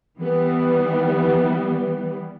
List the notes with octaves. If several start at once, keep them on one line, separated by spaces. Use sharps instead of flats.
E3 G3 B3